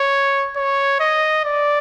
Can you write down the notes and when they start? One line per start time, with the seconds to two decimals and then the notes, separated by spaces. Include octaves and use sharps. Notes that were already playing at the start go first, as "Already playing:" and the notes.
Already playing: C#5
0.56 C#5
1.00 D#5
1.45 D5